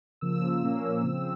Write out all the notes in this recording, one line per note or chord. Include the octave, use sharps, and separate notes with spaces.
C#3 F3 A#3 E6
A#2 F3 A#3 C#4
C#3 F3 C4